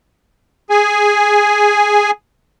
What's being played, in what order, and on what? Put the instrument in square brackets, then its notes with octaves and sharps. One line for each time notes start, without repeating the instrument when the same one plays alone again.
[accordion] G#4 G#5